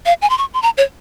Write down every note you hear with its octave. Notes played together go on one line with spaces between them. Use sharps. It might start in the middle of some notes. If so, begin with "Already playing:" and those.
F5
G#5
C6
C#6
C6
A#5
C#5